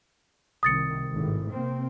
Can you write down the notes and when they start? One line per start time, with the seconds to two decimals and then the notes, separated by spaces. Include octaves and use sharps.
0.63 C2 D#3 D#6 A6 C#7
1.13 G#1 A2
1.50 C3 A#3 C4